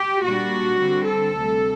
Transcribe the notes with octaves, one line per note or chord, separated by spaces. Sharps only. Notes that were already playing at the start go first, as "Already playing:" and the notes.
Already playing: G4
A#2 G3 D4 F#4
D3 G3 C4
A4
D2 C3 G3